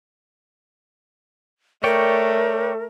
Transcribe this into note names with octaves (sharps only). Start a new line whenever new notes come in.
A3 A#4 C#5 D5 G5